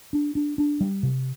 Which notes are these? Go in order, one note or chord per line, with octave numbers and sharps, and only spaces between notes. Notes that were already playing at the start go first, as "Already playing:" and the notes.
D4
D4
D4
G3
C3